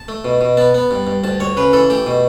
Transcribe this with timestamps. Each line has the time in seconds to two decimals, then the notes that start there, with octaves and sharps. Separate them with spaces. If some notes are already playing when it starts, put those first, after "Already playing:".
Already playing: A5
0.08 A3
0.25 B2
0.41 B2
0.57 B3 A5
0.74 B3
0.91 G2
1.07 G2
1.24 D2 A5
1.40 D2 C#5
1.57 C#3 B4
1.73 E3 A4
1.90 A3 G4
2.06 B2